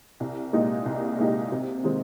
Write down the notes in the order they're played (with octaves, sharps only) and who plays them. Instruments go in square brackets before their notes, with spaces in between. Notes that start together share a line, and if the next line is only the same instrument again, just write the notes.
[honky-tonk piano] C2
A#2 G#3 D#4 G4
C2
A#2 G#3 D#4 G4
C3
D#3 G#3 C4 D#4